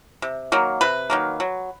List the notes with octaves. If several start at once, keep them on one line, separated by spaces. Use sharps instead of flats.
C3
D#3 F#3 A#3
C3 B4
D#3 F#3 A#3
F#3